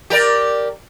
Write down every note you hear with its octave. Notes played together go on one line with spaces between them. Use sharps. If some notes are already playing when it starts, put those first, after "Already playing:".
G4 A#4 D5